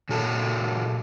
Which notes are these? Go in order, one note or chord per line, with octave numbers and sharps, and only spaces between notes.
A#2 F#3 A4